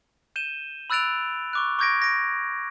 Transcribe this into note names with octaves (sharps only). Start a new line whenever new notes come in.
G6 D#7 E7 G7
B5 E6 F#6 A6 D7 F7
C#6 D6 F#6
C#6 D6 G6 G#6 A#6 D7
G#6 A#6 D7